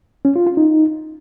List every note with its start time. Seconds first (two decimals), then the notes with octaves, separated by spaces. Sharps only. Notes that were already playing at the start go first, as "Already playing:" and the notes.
0.25 C#4
0.36 F4
0.46 F4
0.57 D#4